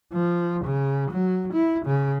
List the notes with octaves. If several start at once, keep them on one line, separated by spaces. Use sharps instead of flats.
F3
C#3
F#3
E4
C#3